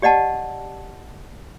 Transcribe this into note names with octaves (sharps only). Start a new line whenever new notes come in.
G4 D5 D#5 F#5 A5